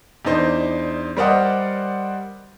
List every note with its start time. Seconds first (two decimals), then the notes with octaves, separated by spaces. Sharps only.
0.25 E2 D4 D#4 C5
1.17 G3 A#4 C5 D5 D#5 F#5